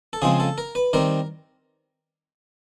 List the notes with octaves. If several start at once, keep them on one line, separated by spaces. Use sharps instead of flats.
A4
C#3 F3 G#3 C4 G#4
A4
A#4
B4
D#3 G3 C4 A#4